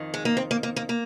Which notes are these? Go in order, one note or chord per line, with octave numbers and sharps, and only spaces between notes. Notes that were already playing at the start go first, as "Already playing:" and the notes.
Already playing: F2 D#3
G#3
A#3
C4
A#3
A#3
A#3
A#3